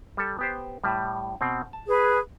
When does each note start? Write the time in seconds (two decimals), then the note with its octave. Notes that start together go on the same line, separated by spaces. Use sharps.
0.17 G3 A4
0.39 B3 G4 C5
0.84 A2 G3
1.41 B2 C4
1.73 A5
1.87 G#4 B4